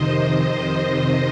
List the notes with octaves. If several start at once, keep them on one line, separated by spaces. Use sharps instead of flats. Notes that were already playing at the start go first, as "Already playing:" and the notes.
Already playing: F2 C3 D#3 C5 D#5
C5 D#5
C5 D#5